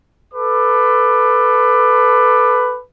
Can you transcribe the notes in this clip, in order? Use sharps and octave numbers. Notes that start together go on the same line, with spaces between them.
A4 B4 D6